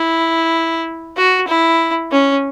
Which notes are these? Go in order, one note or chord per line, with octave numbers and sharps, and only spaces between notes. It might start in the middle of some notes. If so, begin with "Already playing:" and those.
Already playing: E4
F#4
E4
C#4